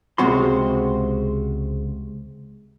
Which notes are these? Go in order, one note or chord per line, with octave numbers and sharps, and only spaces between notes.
C#2 C3 G#3 C4 F#4 C6